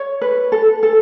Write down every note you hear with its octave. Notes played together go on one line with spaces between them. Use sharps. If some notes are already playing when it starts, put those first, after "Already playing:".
Already playing: C#5
B4
A4
A4